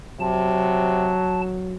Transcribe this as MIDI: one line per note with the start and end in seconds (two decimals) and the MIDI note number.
0.20 1.14 48
0.20 1.75 54
0.20 1.41 81